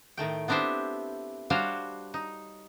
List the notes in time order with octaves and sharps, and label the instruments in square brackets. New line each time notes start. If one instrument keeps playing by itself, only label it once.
[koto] A2 D#3 A3 G5
B3 C4 D4 E4 G4 C5
G3 D4 F#4 C5 C#5 F5
D#4